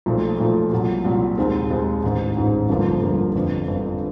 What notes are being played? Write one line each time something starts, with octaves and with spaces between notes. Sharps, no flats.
B1 A#2 F3 A3
B1 A#2 F3 A3
C2 A#2 F#3
C2 A#2 F#3
D#2 D#3 G#3 C4
D#2 D#3 G#3 C4
A1 G#2 D#3
A1 G#2 D#3
G1 G2 D3 F3 A#3
G1 G2 D3 F3 A#3
G1 F2 D3
G1 F2 D3